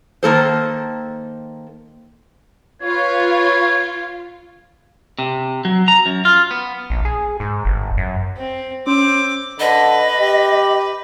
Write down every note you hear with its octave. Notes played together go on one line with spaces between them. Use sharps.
D#3 A#3 A4 C5
F4 B4 C#5 G#6
C3
F#3
A#5
F#2
F4
B3
A#1
G#4
G#2
G1
F#2
C4
C4 C#4 D6
D3 B4 D#5
G4